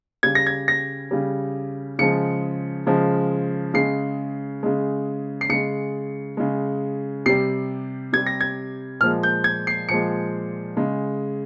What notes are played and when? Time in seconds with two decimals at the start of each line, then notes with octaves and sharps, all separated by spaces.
0.23 C#3 G3 G#6
0.35 A#6
0.47 G#6
0.68 A#6
1.11 C#3 G3
1.99 C#3 F3 G#3 C#7
2.86 C#3 F3 G#3
3.74 C#3 G#3 C7
4.63 C#3 G#3
5.41 C7
5.49 C#3 G#3 C#7
6.37 C#3 G#3
7.26 C3 G3 C7
8.13 C3 G3 G#6
8.27 A#6
8.41 G#6
9.00 A#2 F3 G#3 F6
9.23 G6
9.44 G#6
9.67 C7
9.89 A#2 F3 G#3 C#7
10.77 C#3 G#3